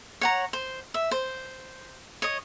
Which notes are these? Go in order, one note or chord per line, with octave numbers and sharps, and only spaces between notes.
C#5 F#5 A#5
C5
E5
C5
C#5 D#5